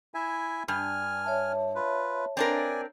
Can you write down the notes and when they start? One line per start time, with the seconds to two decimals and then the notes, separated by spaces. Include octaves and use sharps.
0.14 E4 E5 G#5
0.68 G2 G#5 F6
1.24 C#5 E5 A5
1.75 F4 B4
2.37 C4 D4 A#4 D5 G#5